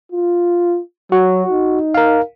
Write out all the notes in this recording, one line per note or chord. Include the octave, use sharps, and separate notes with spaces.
F4
F#3 F#4
D#4
A#4 F5